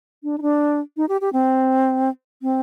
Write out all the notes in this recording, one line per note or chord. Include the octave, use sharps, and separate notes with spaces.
D4
D#4
D4
D#4
G4
G4
C4
C4